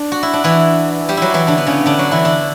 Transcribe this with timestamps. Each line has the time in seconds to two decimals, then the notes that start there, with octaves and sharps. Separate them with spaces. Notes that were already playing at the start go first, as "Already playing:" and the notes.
Already playing: D4
0.12 F#4
0.23 E4
0.34 D4
0.44 E3 E4
1.09 G3 G4
1.17 F#3 E4 F#4
1.34 E3 E4
1.47 D3 D4
1.58 B3
1.67 C#3 C#4
1.86 D3 D4
1.99 F#3 F#4
2.11 E3 E4
2.25 D3 D4